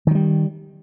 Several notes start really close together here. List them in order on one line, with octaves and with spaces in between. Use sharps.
D#3 F#3 G3